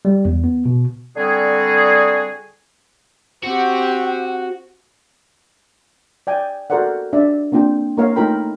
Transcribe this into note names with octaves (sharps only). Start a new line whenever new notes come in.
G3
E2
B3
B2
D3 G3 C4 F#4 G#4
C4 F#4 G4 F#5
D5 G5 G#5
F#4 A4 A#4 C5 D5 F#5
D4 D5 E5
A#3 C4 D4 F4 G5
A#3 E4 A#4 C#5 F5
A3 D#4 F4 A#4 G5 B5